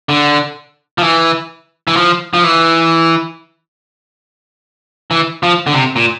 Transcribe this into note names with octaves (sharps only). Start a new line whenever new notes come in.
D3
F3
E3
E3
F3
F3
E3
E3
F3
D3
C3
A#2